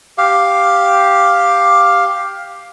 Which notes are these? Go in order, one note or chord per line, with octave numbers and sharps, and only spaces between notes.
G4 F5